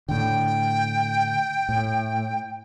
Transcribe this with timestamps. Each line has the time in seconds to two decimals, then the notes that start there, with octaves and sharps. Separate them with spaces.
0.09 A2 D3 G5
1.69 A2